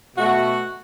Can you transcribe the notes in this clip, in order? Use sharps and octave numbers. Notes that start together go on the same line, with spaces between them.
B2 A3 F#4